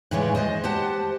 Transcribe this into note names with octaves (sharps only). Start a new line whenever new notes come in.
A2 C#3 E3 G#3 C#5 D5
G#3 C5 D#5
G4 C5 F#5 A5